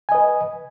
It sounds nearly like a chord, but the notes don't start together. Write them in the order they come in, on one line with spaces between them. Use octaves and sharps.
G#5 D#5 B4